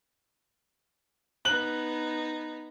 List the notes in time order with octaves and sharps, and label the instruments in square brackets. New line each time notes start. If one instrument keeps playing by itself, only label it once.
[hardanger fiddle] B3 D#4 [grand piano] F#6 F#7